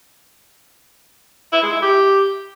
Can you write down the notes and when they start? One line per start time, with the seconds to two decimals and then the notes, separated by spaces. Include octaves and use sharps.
1.53 E4
1.63 G#3
1.72 E4
1.82 G4